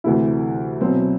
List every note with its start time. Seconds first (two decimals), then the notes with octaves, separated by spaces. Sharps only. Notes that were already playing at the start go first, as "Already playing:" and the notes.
0.04 D2 C3 E3 A3 E4
0.81 B2 F#3 C4